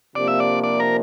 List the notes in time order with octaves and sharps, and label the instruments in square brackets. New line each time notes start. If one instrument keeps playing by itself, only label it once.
[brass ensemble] C3 F3 A#3 D4 [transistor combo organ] D5
[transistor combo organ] E5
D5
D5
A#4